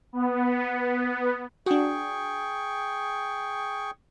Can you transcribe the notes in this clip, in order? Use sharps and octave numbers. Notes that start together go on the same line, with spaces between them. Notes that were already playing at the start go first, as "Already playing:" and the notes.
B3
D4 F#4 G#4 G5 C#6